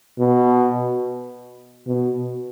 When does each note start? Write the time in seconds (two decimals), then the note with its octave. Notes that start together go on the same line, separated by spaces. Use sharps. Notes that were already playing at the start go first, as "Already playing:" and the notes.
0.19 B2
1.87 B2